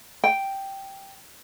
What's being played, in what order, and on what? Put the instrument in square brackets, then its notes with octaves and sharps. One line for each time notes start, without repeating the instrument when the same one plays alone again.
[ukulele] G5